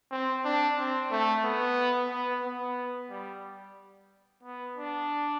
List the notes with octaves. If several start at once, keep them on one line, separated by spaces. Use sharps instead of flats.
C4
D4
C4
A3
B3
B3
B3
G3
B3
D4